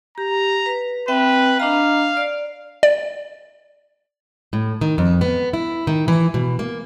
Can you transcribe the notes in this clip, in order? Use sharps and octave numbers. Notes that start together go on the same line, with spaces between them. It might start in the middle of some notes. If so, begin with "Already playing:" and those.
G4 A#5
B4
C4 B4 E5 G5
D4 D#5 F5 A#5
D5
D5
A2
D#3
F2
B3
E4
D#3
E3
B2
A#3